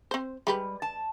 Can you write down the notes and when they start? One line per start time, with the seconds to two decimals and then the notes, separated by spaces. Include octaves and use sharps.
0.11 C4 C5
0.47 G3 G#3 G4 B4
0.82 A5